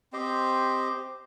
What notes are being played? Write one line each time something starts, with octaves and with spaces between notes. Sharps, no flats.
C4 G4 C5 D#5